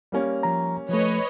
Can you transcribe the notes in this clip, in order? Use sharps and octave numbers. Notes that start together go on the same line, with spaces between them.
G3 A#3 C#4
F3 A#5
F3 A3 B4 C#5 D#5